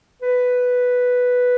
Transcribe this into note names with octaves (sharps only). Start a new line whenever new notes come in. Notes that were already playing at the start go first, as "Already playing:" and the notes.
B4